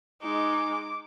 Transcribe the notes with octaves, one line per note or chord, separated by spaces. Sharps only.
G#3 D#4 D6